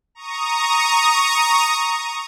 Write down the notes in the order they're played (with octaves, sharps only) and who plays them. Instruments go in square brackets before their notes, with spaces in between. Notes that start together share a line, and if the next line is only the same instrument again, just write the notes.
[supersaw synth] A#5 C#6 D#6